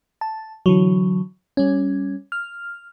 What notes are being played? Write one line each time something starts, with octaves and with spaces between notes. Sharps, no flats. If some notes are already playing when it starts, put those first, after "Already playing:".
A5
D3 E3 F#3
G3 C#4
F6